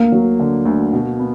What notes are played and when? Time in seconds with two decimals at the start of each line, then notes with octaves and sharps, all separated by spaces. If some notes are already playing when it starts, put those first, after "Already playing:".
Already playing: D2 A#3
0.12 F#3
0.40 D3
0.66 D2
0.93 B2
1.20 B3